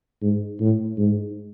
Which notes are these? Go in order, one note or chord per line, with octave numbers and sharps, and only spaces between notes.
G#2
A2
G#2